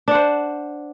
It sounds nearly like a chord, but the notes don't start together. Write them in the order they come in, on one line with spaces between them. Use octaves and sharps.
D4 F#5 C5